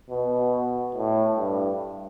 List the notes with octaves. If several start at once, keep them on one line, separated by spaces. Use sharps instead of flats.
B2
A2
G2